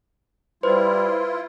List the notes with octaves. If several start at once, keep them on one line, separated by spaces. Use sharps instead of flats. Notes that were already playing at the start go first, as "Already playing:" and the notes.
G3 E4 F4 B4 C5